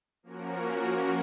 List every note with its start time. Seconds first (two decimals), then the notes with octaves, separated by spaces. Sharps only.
0.23 F3 A#3 C#4 F#4 A#4